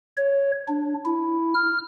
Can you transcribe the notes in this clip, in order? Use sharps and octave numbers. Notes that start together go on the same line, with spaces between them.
C#5
D4
E4
F6